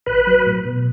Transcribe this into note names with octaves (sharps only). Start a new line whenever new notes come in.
A1 B4
F#3
A2
B2